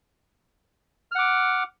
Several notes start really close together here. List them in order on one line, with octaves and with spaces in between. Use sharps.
F6 F#5 D6